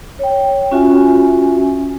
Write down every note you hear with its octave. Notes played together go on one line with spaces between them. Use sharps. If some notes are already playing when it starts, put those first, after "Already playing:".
C#5 G5
C#4 F4 F#4 E5 G#5